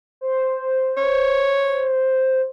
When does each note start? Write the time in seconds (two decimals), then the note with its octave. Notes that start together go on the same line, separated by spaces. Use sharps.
0.21 C5
0.97 C#5